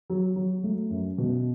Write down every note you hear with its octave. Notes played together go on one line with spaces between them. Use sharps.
F#3
F#3
A3
F#2
B2